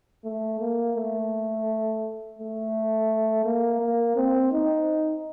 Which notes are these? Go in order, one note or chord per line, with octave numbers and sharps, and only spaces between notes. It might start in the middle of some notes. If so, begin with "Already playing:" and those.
A3
A#3
A3
A3
A#3
A#3
C4
D#4